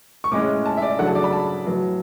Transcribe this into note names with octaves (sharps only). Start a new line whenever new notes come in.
C#6
A2 G#3 C#4 D6
A5
E5
D5
C#3 F#3 A3 D4 F#5
A5
D5
B5
A5
A2 F#3 B3